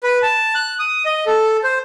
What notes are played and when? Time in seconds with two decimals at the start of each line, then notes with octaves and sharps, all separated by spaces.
0.03 B4
0.23 A5
0.55 F#6
0.79 D#6
1.05 D#5
1.26 A4
1.64 C5